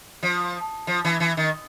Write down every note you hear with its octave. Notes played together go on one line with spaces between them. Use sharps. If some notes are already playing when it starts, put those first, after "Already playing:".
F3
F3
E3
E3
D#3